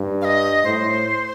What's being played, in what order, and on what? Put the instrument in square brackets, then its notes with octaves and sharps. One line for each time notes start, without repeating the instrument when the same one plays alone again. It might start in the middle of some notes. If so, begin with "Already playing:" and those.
Already playing: [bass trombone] G2
[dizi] F5
D#5
[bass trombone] A2 [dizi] C5